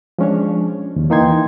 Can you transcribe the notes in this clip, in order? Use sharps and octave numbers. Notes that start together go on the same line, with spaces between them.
F3 G#3 C#4 D4 C#5
D#2
E3 A#3 D#4 G5 C6 G#6